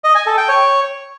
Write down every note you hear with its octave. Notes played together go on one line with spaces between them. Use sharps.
D#5
G#5
A4
G5
C#5